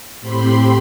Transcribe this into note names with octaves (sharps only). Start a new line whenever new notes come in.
A2 C4 G4 B5 C6